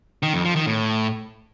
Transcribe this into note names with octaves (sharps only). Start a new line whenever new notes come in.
D#3
F2
F3
D#3
A2